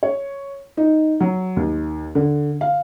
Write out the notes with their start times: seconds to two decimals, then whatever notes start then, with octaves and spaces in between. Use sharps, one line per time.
0.03 C#5
0.77 D#4
1.20 F#3
1.57 D#2
2.15 D3
2.61 F5